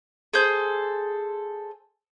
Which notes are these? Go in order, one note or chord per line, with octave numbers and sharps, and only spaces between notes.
G#4 A4 C5 G6